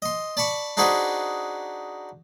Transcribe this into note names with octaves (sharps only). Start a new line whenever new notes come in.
D#5 C6
D5 A5 B5 C#6
D4 D#4 F#4 G#4 B4 C5